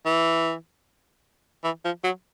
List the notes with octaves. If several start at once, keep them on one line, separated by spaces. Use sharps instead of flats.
E3
E3
F3
F#3